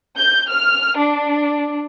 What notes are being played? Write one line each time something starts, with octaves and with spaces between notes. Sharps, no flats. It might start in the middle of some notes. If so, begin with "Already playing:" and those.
G6
F6
D4